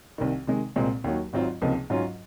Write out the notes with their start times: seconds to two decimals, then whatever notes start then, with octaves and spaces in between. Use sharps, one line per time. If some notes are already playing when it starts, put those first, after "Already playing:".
0.18 C2 C3 D#3
0.47 C3 D#3 G#3
0.76 C2 A#2 G#3 C4
1.04 D#2 D#3 F#3
1.33 G#1 G#2 F#3 C4 F4
1.61 C#2 C3 F3 A#3 D#4
1.90 G#2 F#3 C#4 F4